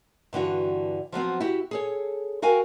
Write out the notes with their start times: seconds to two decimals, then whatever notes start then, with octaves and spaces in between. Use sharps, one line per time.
0.33 G2 D3 E3 F#4
1.12 F3 F#3 B3 C4
1.40 E4 F#4 G4
1.71 G#4 A4 C#5
2.42 F#4 A#4 F5 G5 G#5